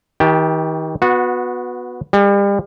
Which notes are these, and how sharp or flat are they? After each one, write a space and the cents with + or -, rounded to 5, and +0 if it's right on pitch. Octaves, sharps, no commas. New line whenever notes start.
D#3 +40 G4 +0 A5 -20
B3 +0 F#4 -25
G3 +40 A4 +0